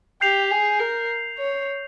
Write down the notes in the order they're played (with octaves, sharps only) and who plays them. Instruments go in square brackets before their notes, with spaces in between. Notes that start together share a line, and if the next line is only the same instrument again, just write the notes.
[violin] G4 [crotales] G6 C7 F7
[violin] G#4
A#4
C#5